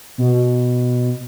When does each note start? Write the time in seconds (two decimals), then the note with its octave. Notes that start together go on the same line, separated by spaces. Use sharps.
0.18 B2